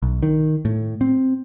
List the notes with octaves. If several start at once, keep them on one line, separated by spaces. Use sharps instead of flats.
B1
D#3
A2
C4